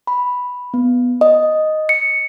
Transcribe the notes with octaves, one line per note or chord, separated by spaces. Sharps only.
B5
B3
D#5
C#7